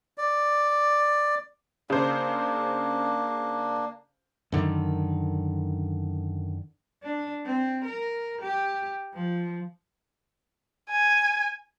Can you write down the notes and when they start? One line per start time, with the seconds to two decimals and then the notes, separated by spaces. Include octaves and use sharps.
0.18 D5
1.90 C#3 A#3 D4 C5
4.52 F#2 D3 D#3
7.03 D4
7.45 C4
7.84 A#4
8.42 G4
9.14 F3
10.90 G#5